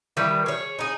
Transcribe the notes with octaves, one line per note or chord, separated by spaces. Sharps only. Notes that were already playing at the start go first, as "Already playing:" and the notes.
D#3 E3 G3
G#4 C#5
D#4 G#4